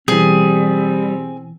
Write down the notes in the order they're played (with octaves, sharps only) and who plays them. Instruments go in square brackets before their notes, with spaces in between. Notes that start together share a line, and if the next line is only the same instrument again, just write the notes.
[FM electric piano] B2 E3 [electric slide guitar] G3 [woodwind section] C4 [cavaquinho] G#4